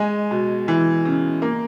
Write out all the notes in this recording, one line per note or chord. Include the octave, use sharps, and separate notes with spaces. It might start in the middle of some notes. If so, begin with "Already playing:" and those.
Already playing: G#3 G#5
B2
E3
C#3
A#3